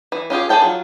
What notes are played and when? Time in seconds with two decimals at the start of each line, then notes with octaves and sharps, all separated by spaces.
0.12 E3
0.30 C#4 F4 G4 G#4
0.49 G#4 A4 C#5 G5 A5
0.62 F#3 F4